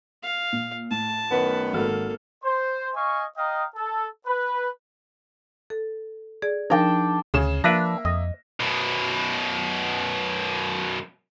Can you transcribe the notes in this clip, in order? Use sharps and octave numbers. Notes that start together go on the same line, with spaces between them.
F5
A#2
A2 A5
F#2 D#3 B3
G#1 A#3 F#4 A4 F6
C5
D#5 F5 G#5 C#6
D#5 F5 G5 A#5 D#6
A4
B4
A4
G#4 D5
F3 D4 D#4 A#4 G5 A5
D2 C#3 G#4 E7
F3 A#3 D4 B4 E5 A#6
F2 D#5
F#2 B2